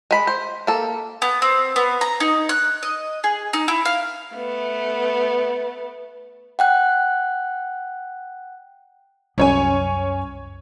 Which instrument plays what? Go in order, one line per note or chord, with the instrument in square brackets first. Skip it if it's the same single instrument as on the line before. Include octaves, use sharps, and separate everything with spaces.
[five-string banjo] G#3 B5
C5
A#3 A4
[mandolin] B3
C4
B3
A#5
D#4
F#6
D#5
G#4
D#4
E4
F5
[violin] A3 B3
[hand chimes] F#5 G5 F#6
[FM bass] C2 [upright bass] F#2 [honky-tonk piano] C#4 C#5 G#5